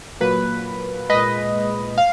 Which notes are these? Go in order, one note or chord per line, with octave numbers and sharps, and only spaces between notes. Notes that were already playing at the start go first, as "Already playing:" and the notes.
A#2 F#3 A#3 B4
A#2 G#3 B4 D#5
F5